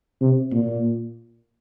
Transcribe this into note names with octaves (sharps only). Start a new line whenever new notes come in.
C3
A#2